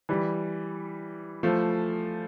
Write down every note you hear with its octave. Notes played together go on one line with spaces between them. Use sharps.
E3 G3
F3 A3